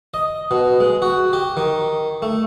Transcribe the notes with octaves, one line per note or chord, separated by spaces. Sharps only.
D#5
B2
G#3
F#4
G4
D#3
A3